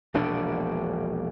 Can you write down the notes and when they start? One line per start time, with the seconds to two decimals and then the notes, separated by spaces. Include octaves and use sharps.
0.14 E1 A#1 B2 D4